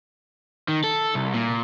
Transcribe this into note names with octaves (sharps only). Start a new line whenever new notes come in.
D#3
A4
C2
A#2